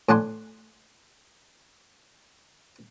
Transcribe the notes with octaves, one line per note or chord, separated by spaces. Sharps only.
A2 D4 F#5 G#5 C6